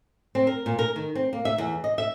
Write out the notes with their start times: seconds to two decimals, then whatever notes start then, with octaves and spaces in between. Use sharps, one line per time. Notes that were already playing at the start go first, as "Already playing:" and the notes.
0.35 C4
0.47 A#4
0.66 A#2
0.79 A#4
0.96 D#3
1.15 C4
1.33 A#3
1.45 E5
1.58 E2
1.84 D#5
1.98 E5